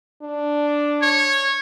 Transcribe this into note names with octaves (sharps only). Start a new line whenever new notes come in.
D4
C#5